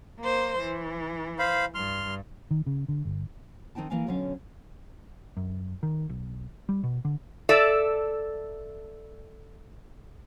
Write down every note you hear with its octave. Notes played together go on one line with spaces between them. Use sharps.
A#3 C5
E3
C5 F5 B5
G2 C6 F6
D#3
C#3
D3
G1
D#3 C4 D#4 G5 A5
E3 A#3 F5 G#5
B2 D3 F#3 C#4 C#5 F5
F#2
D#3
B1
G3
B2
D3
A4 D5 E5